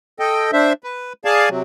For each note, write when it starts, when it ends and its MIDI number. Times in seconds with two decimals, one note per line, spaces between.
0.19 0.51 69
0.19 0.51 75
0.19 0.51 79
0.53 0.73 62
0.53 0.73 72
0.53 0.73 76
0.84 1.13 71
1.25 1.49 68
1.25 1.49 74
1.25 1.49 77
1.25 1.49 80
1.25 1.49 81
1.49 1.62 48
1.49 1.62 54